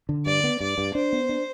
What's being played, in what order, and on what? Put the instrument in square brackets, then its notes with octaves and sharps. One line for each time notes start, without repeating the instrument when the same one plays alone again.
[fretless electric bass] D3
[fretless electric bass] G2 [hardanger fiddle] D5
[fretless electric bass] B3
[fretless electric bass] G2 [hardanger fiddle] D5
[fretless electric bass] G2
[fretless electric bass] D4 [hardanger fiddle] C5
[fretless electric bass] B3
D4